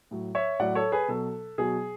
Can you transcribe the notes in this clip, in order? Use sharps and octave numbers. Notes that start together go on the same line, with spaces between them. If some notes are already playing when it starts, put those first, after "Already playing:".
A2 F#3
C#5 E5
A2 F#3 D5 F#5
A4 C#5
G#4 B4
B2 F#3 A4
B2 F#3 G#4